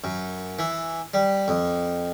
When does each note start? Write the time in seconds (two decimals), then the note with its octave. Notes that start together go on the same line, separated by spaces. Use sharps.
0.04 F#2
0.59 E3
1.14 G3
1.48 F2